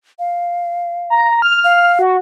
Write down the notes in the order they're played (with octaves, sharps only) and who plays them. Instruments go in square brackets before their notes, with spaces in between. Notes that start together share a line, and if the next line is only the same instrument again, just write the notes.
[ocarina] F5
[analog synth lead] A#5
F6
[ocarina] F5
[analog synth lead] F#4